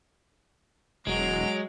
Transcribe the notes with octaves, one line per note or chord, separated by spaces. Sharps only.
E1 F#3 G#3 D7 F7